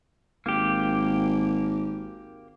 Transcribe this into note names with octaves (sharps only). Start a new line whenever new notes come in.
G#1 A#3 G4